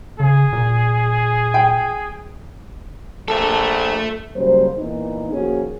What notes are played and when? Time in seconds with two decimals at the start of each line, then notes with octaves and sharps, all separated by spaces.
0.20 C#3 G#4
0.53 A#2
1.54 G5
3.28 A#1 A4 E5
4.36 C#3 F#3 G3 A#3 C5
4.78 A#2 E3 B3 D#4
5.33 D#3 F3 A#3 C#4 F#4 G#4